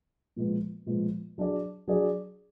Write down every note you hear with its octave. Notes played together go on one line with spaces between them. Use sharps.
A#2 F3 G#3 B3
A#2 F3 G#3 B3
F#3 D4 G#4 D5
F#3 D4 G#4 D5